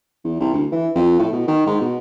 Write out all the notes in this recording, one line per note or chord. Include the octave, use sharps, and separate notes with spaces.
E2
C2
D2
E3
F2
A2
B2
D#3
G#2
B2